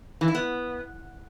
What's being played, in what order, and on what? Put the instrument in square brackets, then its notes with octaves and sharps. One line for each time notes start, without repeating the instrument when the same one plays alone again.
[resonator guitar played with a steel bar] E3
E4
B3